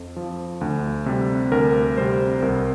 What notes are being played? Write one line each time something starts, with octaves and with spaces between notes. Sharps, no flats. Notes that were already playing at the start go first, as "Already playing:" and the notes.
Already playing: F2 F3
F3
D2
C3 G3
D2 A#4
C3 G3 C5
C2 A#4